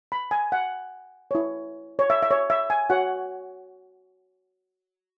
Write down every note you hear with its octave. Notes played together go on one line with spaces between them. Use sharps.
B5
G#5
F#5
E4 C#5
C#5
E5
E5
C#5
E5
G#5
F#4 C#5 F#5